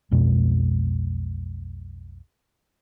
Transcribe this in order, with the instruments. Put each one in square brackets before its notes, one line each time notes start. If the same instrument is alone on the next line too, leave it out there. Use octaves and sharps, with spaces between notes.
[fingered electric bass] B1 F2 B2 G#3